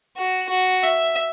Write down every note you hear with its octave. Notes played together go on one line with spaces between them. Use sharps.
F#4
F#4
E5